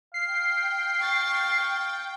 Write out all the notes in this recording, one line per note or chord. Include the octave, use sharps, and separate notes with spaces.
F5 G5 C7
C#6 A6